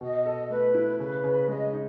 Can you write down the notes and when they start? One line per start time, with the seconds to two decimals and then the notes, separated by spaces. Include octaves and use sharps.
0.01 B2 D#5
0.26 A4
0.50 A3 B4
0.75 E4
0.99 C#3 B4
1.24 C#3
1.48 G#3 D#5
1.73 D#4